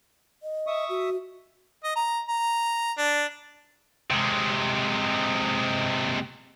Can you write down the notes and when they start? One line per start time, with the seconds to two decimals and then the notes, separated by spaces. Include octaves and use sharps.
0.43 D#5
0.67 E5 C#6 D#6
0.89 F#4
1.84 D#5
1.96 A#5
2.28 A#5
2.98 D4
4.11 C3 G#3